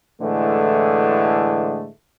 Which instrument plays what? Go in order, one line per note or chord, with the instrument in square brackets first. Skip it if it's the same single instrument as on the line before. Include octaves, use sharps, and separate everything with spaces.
[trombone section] A2 D3 E3 G#3 A3